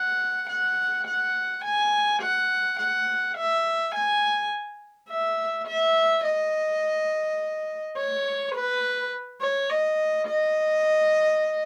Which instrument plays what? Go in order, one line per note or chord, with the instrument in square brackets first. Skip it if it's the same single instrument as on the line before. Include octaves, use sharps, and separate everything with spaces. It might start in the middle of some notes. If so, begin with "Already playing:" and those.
Already playing: [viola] F#5
F#5
F#5
G#5
F#5
F#5
E5
G#5
E5
E5
D#5
C#5
B4
C#5
D#5
D#5